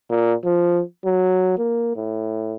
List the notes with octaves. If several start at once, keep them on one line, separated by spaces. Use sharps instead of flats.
A#2
F3
F#3
A#3
A2